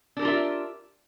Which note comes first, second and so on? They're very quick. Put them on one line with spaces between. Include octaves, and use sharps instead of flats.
D4 A#4 G4 F4 E5